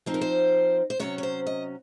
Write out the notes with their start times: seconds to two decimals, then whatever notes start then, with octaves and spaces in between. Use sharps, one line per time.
0.06 F3 C4 D#4 C5
0.14 A#4
0.21 C5
0.90 C5
0.99 C3 F#3 C#4 C#5
1.18 C#5
1.23 C5
1.47 D#5